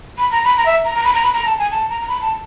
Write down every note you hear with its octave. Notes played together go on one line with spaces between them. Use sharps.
B5
A#5
B5
A#5
E5
A#5
A#5
B5
A#5
B5
A#5
A5
G#5
A5
A#5
A#5
B5
A5